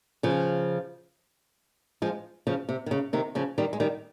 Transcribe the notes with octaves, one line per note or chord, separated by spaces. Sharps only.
C#3 F3
F3 G#3
C#3 F3
C3
D#3
C#3
C3 D#3
C#3 F3
D#3 G3
G#3
D#3 G3